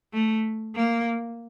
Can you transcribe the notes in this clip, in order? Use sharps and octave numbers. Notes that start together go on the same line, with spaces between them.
A3
A#3